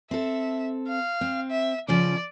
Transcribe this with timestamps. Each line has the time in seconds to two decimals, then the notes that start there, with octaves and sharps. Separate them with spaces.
0.11 C4 A4 E5
0.88 F5
1.21 C4
1.50 E5
1.88 C#3 F3 C#4 D5